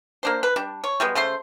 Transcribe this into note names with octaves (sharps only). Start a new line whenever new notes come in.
A#3 D4 C5
B4
G3 D4
C#5
G3 G#3 B3
C#3 A3 C5 C6